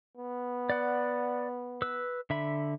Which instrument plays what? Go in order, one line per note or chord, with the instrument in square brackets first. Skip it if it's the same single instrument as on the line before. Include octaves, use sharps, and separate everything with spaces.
[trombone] B3
[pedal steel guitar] D5 F#5
B4 E6
D3 E5 B5